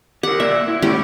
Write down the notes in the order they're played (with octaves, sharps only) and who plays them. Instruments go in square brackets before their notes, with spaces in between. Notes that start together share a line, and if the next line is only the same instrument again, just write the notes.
[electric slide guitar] G4 A#4 [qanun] F#5
[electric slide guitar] A#3 D5 [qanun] E5
[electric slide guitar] E4
[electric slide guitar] G#2 A3 [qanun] C#4 G4 B5